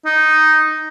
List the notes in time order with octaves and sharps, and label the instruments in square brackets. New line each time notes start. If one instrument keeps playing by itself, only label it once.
[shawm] D#4